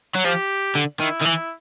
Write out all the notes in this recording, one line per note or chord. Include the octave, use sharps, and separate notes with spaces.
F#3
F3 G4
D3
D#3 E4
D#3
E3